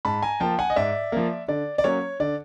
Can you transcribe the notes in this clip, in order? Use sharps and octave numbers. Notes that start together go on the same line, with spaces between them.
G#2 A5 B5
G#5 A#5
F3 A#3 G5 A5
F#5 G#5
D#5
G#2 D5 E5
F3 A#3
D3 D5
D5
F#3 A#3 C#4 C#5
D3 D5